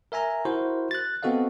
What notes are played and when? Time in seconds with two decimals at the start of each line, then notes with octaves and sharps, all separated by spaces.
0.12 A#4 E5 G#5 A#5
0.45 E4 F#4 A#4 C5
0.91 F#6 A6
1.23 B3 C4 F#4 A4 D#5 F5